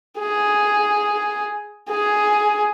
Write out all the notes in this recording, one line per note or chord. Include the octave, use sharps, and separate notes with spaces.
G#4
G#4